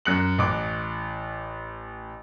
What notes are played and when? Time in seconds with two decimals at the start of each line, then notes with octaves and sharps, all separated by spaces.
0.05 F#2 F#6 C#7 F#7
0.38 A1 D6